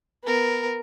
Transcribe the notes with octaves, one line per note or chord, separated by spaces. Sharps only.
B3 A#4